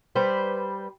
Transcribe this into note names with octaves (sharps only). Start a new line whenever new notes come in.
G3 B4 C5 D5